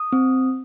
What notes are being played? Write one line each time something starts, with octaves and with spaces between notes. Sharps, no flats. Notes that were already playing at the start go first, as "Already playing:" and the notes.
Already playing: D#6
C4